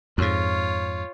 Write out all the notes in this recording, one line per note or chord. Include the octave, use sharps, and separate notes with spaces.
F2 G#2 F4 C#5